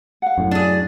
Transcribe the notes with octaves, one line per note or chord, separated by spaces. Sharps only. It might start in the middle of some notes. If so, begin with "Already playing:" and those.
F5 F#5
F#2 A2
D4 G#4